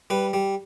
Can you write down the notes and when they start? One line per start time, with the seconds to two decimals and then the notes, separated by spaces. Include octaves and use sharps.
0.10 G3 B4
0.33 G3